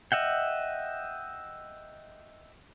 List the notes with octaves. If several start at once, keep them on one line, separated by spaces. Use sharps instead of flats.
D#5 E5 F#5 G5